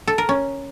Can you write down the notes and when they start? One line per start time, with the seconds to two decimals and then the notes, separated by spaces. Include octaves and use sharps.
0.08 A4
0.18 A#4
0.29 C#4